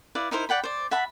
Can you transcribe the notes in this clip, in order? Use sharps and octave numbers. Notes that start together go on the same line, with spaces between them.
E4 B4 D5 F5
D#4 E4 A#4 C5
D5 F#5 G5 B5
C5 D5
E5 F#5 A5 B5